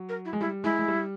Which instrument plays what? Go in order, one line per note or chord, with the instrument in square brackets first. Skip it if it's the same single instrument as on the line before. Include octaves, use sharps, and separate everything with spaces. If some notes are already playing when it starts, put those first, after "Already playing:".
Already playing: [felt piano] F#3
[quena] A#4
E4
[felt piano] G#3
[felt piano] G3 [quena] E4
[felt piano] G#3 [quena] E4
[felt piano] G#3
G3